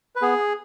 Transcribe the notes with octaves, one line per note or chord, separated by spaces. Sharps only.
B4
B3 G#4